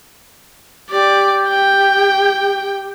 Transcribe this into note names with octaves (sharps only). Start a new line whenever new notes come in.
G4 D5
G5